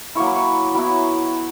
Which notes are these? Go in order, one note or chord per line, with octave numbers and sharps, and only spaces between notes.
F#3 A#3 E4 C#6
B5
C#6
F#3 B3 E4 B5